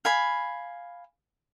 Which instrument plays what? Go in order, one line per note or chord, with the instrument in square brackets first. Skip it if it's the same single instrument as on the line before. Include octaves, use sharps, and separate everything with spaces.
[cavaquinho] F5 G#5 B5